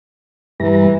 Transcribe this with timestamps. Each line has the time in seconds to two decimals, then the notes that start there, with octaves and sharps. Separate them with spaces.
0.60 G2 E3 G3 A#5